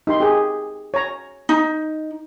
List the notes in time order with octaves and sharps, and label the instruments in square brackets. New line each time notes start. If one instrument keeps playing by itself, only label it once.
[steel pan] D#4 G4 C6
G4 G#4
C#5 A#5
[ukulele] D#4